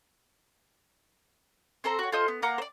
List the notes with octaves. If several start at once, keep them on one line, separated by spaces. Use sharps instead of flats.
C4 A4 C5 A#5
F#4 C#5
F4 A4 C5 D#5
B3
A#3 F#5 A#5 D6
C5 D5